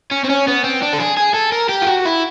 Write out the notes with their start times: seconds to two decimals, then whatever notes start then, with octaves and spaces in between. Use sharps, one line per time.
0.11 C#4
0.24 C4
0.29 C#4
0.48 B3
0.64 C4
0.82 D4
0.94 A4
1.00 G#4
1.17 G#4
1.34 A4
1.52 A#4
1.69 G4
1.82 F4
1.87 F#4
2.05 E4